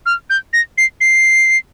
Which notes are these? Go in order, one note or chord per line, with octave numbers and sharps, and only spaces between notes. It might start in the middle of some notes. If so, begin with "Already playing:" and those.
F6
G6
A#6
C7
C7